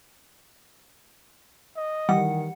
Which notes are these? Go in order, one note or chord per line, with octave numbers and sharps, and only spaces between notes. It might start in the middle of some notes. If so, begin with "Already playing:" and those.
D#5
D#3 E3 G3 F#5